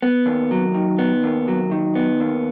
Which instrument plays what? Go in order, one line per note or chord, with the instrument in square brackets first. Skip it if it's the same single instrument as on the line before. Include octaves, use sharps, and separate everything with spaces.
[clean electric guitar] B3
D#2
F#3
D#3
B3
D#2
F#3
D#3
B3
D#2